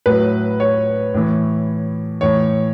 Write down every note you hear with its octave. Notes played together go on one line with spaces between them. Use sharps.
A2 F#3 B4
C#5
A2 E3
A2 E3 C#5